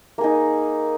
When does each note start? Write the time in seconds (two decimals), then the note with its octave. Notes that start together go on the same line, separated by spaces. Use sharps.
0.18 A#3
0.21 G#4
0.24 D#4